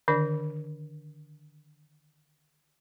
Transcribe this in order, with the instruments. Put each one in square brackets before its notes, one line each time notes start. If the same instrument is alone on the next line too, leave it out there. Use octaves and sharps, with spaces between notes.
[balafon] D3 D#3 D4 D5